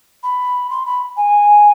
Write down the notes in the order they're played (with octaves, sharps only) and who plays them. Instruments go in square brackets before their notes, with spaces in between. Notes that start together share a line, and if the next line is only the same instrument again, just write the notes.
[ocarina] B5
C6
B5
G#5